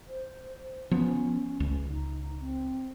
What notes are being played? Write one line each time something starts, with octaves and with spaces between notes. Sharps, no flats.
C5
F3 B3 C#4
C#2
D#4
C4